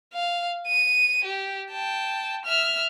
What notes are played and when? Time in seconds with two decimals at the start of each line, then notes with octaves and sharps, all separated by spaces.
0.14 F5
0.67 D#7
1.25 G4
1.71 G5 A5
2.45 E5 F6